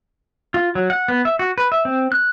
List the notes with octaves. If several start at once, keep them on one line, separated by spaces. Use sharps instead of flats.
F4
F#3
F#5
B3
E5
F#4
B4
E5
C4
F#6